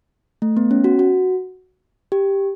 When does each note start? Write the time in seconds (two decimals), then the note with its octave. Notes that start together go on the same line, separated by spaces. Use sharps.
0.42 A3
0.57 B3
0.71 C#4
0.84 F#4
0.99 F#4
2.12 G4